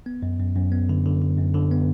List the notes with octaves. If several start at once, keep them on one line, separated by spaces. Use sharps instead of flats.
B3
F#2
F#2
F#2
B3
D3
D3
D3
F#2
D3
B3